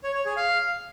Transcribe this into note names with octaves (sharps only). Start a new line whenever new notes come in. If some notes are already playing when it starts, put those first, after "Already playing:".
C#5
C#5
G#4
F5